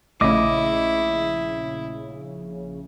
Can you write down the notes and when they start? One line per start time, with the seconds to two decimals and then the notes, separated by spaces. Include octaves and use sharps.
0.21 A#1 C#3 A3 E4 D#5 D6